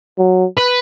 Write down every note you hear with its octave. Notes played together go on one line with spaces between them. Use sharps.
F#3
B4